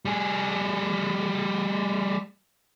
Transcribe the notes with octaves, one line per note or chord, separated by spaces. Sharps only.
G3 G#4